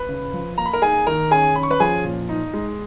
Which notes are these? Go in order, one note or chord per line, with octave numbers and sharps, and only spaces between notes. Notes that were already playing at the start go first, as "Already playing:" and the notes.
Already playing: B4 B5
C#3
F3
A#3 A#5
B5
A#4 A#5
D#4 G#4 G#5
D#3 A#4 A#5
C#4 G#4 G#5
C#4 B5
C#6
B4 B5
F3 G#4 G#5
A#2
D#4
G#3